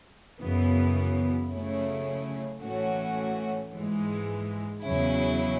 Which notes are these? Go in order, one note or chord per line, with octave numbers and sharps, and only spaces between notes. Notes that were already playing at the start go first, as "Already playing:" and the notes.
F#2 C#3 E3 B3
C#3 F#3 A3 C#4 E4
A2 E3 A3 C#4 F#4
G#2 E3 G#3
E2 C#3 F#3 C#4 E4